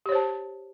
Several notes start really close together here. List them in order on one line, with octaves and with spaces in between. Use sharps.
G4 C#5 C5 A5